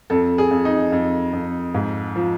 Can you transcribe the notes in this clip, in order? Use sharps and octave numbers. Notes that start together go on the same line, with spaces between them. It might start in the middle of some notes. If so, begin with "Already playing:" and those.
F2 A4
G#4
F2
D#4
F2
F2
G#2
F3